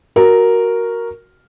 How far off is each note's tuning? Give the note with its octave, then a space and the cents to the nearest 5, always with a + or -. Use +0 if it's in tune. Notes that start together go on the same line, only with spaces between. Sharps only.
F#4 +0 A#4 +0